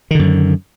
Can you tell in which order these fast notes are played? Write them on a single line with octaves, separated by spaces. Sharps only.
D#3 D3 F#2